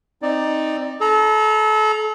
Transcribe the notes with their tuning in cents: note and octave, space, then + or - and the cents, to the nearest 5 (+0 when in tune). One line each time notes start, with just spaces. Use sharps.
C4 +10 D#4 +0 D5 +10
A4 -30 A#5 +0